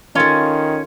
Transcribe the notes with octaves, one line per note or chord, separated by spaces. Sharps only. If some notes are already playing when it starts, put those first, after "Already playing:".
D#3 C#4 F4 A4